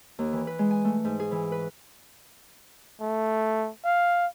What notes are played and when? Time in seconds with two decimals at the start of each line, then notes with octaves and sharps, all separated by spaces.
0.19 D#2
0.33 E3
0.47 B4
0.59 G#3
0.71 G#5
0.85 A3
1.05 G#2
1.20 G#4
1.31 E3
1.52 B4
3.00 A3
3.85 F5